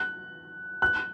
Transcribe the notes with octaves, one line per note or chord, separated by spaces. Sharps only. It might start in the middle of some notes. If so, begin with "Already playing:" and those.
Already playing: F#6
F#6